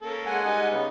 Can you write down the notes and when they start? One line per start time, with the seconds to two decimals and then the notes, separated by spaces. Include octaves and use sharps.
0.02 A#3 C#4 A4
0.26 G#3 F#5 G#5
0.44 G3 D#4 D#5
0.70 C#3 B3